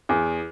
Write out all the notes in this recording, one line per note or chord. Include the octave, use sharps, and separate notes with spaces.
E2